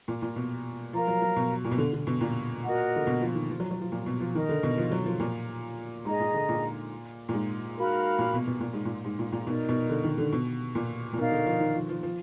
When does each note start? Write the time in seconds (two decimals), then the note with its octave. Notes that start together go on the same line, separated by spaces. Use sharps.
0.08 A#2
0.22 A#2
0.36 B2
0.93 F3 A#4 F5 A#5
1.08 F#3
1.22 F#3
1.36 B2
1.65 A#2
1.71 B2
1.78 D3
1.93 D3
2.07 B2
2.21 A#2
2.64 F#4 A#4 D#5 F#5
2.96 D3
3.07 B2
3.21 F3
3.35 D#3
3.49 F3
3.60 F#3
3.71 F#3
3.81 F3
3.92 A#2
4.06 B2
4.21 F3
4.35 D#3 D#4 A#4 D#5
4.49 D3
4.63 B2
4.78 F3
4.92 F#3
5.06 F3
5.20 A#2
6.05 G#2 G#4 D#5 A#5
6.20 A#2
6.34 D3
6.49 A#2
7.29 A#2
7.34 G#2
7.77 F#4 A#4 F5 B5
8.19 A#2
8.33 B2
8.47 B2
8.60 A#2
8.73 G#2
8.85 A#2
9.05 G#2
9.19 A#2
9.32 A#2
9.47 B2 D#4 A#4 D5
9.69 B2
9.90 D3
10.04 D#3
10.18 D3
10.33 B2
10.75 A#2
11.13 A#2
11.18 B2 D#4 A#4 D5 F5
11.32 D3
11.46 F3
11.60 D#3
11.74 F3
11.89 F3
12.03 F3